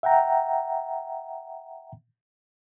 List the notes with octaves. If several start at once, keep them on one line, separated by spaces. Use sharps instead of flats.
E5 F#5 G5 A#5